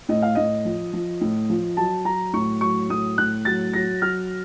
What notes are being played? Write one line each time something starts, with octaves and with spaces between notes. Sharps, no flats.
A2 D#5
F5
A2 D#5
F3
F3
A2
F3
F#3 A5
F#3 A#5
A2 C#6
F#3 C#6
A2 D#6
A2 F#6
F#3 A6
F#3 A#6
F#3 F6